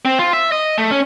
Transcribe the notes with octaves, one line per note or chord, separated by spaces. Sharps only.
C4
F4
E5
D#5
A3
C#4